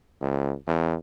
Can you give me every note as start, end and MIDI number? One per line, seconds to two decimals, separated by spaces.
0.21 0.54 37
0.67 0.95 40